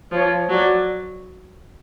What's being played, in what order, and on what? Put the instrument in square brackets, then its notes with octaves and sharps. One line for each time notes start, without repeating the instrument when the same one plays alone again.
[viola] F3 [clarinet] C#5
[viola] F#3 [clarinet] D5